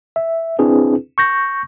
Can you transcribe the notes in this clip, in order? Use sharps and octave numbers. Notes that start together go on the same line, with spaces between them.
E5
C4 D4 E4 G#4 B4
C#6 G6 A#6